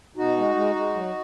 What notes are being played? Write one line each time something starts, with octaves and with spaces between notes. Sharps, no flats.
B2 D#4 F#4
G#3
G#3
G#3
F#3